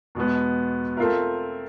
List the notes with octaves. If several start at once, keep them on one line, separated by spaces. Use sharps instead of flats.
E2 B2 G#3 B3
A3 C4 F4 A#4